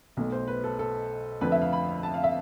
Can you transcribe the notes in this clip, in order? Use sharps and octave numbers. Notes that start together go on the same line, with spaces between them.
B1 B2 A3
C5
B4
A4
A4
F2 D3 F3 A3 B4
E5
F5
B5
A5
F5
E5